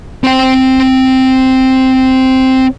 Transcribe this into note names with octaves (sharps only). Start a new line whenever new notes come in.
C4 G5